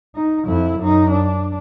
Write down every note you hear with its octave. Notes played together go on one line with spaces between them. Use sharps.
D#4
F2 E4
F#2 D#4
D4